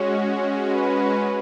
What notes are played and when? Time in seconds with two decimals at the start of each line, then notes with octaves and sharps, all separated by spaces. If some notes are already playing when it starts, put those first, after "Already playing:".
Already playing: G#3 C#4 F#4 C#5
0.72 B4